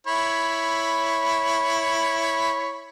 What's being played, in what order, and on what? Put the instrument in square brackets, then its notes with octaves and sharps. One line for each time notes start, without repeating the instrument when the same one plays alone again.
[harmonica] E4 C#5 B5